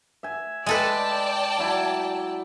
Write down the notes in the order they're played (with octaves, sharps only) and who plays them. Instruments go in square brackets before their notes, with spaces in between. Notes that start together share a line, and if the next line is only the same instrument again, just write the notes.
[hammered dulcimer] E5 G#5
[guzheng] G#3 A4 B4 [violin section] D5 G5 A5 [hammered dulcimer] E5
[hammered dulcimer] F#3 E4